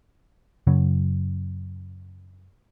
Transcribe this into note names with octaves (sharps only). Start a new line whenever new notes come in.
F#2 C#3 F#3 C#4